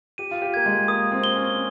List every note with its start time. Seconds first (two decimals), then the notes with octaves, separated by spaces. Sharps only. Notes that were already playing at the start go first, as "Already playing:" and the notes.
0.18 G4 D#7
0.31 F4
0.42 G4
0.54 A#3 G#6
0.66 G#3
0.88 A#3 D#6
1.12 C4
1.24 G7
1.35 C#4